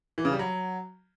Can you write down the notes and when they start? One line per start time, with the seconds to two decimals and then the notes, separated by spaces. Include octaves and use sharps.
0.18 E3
0.25 C#3
0.32 G3
0.39 F#3